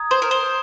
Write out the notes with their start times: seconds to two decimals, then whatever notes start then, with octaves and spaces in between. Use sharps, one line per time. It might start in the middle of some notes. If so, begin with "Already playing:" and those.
Already playing: A#5 D#6 G#6
0.11 C5
0.22 A#4
0.31 C5